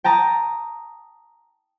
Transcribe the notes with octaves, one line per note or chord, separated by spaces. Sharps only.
G5 A5 A#5 D#6